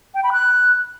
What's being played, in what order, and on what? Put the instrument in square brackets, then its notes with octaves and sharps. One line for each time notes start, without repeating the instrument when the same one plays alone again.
[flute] G5
B5
F#6